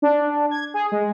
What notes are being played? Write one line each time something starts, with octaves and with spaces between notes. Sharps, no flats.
D4
G#6
G#4
G#3